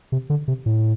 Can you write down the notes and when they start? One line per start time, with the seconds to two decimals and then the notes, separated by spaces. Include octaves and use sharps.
0.12 C3
0.30 D3
0.48 C3
0.66 A2